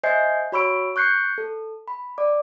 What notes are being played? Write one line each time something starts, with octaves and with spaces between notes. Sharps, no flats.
C5 D#5 E5 G#5 G6 C7
F#4 C#5 B5 C#6 E6 D7
C#6 F#6 G6 C7 C#7
A4
B5
D5 D6